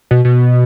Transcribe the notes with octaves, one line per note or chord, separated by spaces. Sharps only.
B2
B2